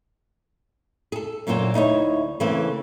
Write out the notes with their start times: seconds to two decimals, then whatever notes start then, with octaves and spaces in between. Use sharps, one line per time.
1.12 G#4 A4
1.47 F#2 A#2 D3 F#3 C5
1.74 D2 D#4 E4 C#5
2.40 C#3 E3 A3 A#3 C4